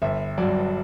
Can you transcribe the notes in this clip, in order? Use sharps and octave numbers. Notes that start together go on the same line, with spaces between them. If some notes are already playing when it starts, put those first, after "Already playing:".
G1 E5
G2 F#3 D5